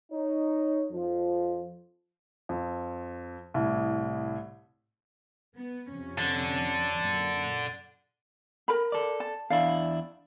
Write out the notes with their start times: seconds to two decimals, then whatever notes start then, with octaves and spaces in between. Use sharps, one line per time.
0.12 D#4 C#5
0.92 F2 F3
2.49 F2
3.54 C2 A2
5.55 B3
5.88 F2 C3 C#4
6.19 D3
7.00 F#2 A#2
8.68 A#4 A#5 B5
8.92 A4 D5
9.20 A5
9.50 E2 D4 E4 F5